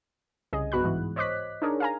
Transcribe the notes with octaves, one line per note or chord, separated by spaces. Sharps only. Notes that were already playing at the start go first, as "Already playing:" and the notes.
C2 C#3 G#4 D#5
B1 G2 B3 F#4 B5 F#6
G#2 E3
C5 C#5 D#5 D6 F#6 B6
D4 D#4 G#4 A#4 C#5
F5 G#5 A#5